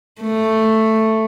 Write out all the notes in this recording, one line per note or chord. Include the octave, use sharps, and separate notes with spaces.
A3